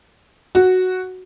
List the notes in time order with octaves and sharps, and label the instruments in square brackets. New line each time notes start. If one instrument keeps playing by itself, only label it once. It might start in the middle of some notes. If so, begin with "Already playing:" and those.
[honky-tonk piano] F#4